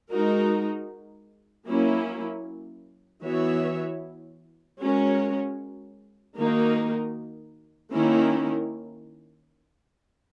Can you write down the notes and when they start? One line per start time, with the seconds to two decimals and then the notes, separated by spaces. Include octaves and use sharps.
0.10 G#3 D#4 F#4 A#4
1.67 F#3 A#3 C#4 E4
3.23 E3 B3 F#4 C#5 E5
4.80 G#3 C#4 F#4 A#4 C#5
6.36 D#3 A#3 D#4 F#4 A#4
7.92 D#3 A#3 C#4 E4 A#4